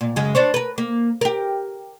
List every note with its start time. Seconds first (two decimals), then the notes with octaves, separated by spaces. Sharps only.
0.01 A#2
0.16 F#2 C#3 G#3
0.35 D4 C5 C#5
0.54 A#4 B4
0.78 A#3
1.21 G4 A#4